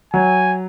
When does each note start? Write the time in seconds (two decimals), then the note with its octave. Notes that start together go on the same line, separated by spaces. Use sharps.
0.14 F#3 G#5